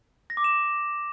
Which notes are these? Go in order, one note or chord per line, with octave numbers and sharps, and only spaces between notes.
A#6
D6
E7